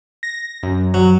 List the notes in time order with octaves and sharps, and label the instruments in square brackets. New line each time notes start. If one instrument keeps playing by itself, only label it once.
[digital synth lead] A#6
F#2
[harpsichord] F#3